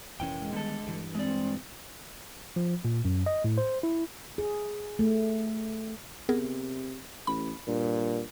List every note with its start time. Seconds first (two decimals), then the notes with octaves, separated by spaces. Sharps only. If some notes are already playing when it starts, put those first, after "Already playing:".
0.20 F1 A#2 E3 C#4 G5
0.39 G#3
0.52 D3 D#3 G3 B3 A4
0.87 G2 E3
1.15 G#3 C4 D5
2.56 F3
2.85 A#2
3.05 F#2
3.26 D#5
3.44 A2
3.58 C5
3.83 E4
4.38 G#4
4.99 A3
6.29 C3 B3 G#4 A#4
7.27 A1 B5
7.67 G2 A#2